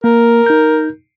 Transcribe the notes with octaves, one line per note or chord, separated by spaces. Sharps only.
A#3 A#4
D#4 G6